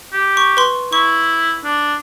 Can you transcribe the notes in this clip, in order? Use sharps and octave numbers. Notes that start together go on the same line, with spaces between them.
G4
C#6
B4 C6
E4 C#6
D4